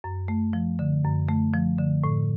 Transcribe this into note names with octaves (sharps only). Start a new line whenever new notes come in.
F#2
A3
F3
D3
F#2
A3
F3
D3
A2